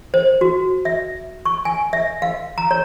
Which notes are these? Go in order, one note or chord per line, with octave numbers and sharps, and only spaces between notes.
C5
F#4
E5
C#6
G#5
E5
F5
A#5
C#5